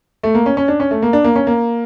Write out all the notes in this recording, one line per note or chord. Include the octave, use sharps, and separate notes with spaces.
A3
A#3
C#4
C#4
D4
C#4
A3
A#3
D4
A#3
C#4
A#3